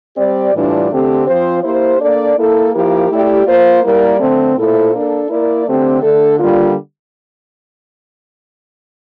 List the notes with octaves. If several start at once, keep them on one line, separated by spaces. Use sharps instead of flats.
G3 C4 G4 D5
A2 E3 G3 D4 F4
D3 A3 C4 G4
F3 C4 F4 C5
A#3 E4 G4 C5
A#3 D4 A4 D5
A#3 E4 A4
F3 A#3 E4 G4 A#4
A3 E4 G4 D5
A#3 F4 C5
G3 A#3 E4 A#4 D5
D3 A3 C4
A#2 A3 E4 A4 C5
A#3 D4 A4
A#3 E4 A#4 D5
D3 A3 C4 G4
D3 A3 D4 A4
D3 G3 A#3 F4